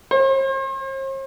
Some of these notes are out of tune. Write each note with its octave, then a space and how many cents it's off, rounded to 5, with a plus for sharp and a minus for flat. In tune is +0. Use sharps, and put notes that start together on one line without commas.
C5 +45